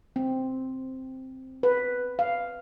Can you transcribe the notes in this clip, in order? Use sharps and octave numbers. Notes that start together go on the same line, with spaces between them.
C4
B4
F5